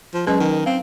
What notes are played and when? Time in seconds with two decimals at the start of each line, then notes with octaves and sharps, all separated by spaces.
0.14 F3
0.27 F#3 G#3 C#4 B4
0.40 D#3
0.66 C4 F5